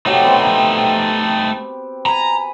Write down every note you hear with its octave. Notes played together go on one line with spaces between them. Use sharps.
C3 F#3 A3 D#4 G4
B3 C4
G#5 A#5 B5